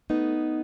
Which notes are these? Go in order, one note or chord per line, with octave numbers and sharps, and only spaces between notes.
A3 B3 D#4